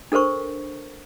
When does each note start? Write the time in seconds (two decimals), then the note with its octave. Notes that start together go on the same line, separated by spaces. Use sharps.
0.12 D4 A4 A#4 C5 C#6